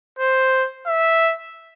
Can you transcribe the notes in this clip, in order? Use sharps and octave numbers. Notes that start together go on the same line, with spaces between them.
C5
E5